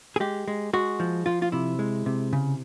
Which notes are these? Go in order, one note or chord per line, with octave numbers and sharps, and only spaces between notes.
G#4
G#3 G4
G#3
G#3 F#4
F3
F3 F4
F4
C3 E4
G#3
C3
C#3